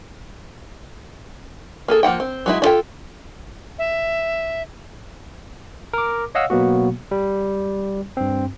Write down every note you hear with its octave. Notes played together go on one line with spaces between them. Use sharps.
A#3 G#4 A4
F3 A#3 F#5 G5
C4
F#3 G#3 E4
D4 F4 A4 G5
E5
A#4 D6
C#5 D#5 F5 F#5 E6
B2 F#3 A#3 B3 F#4
G3
G2 C4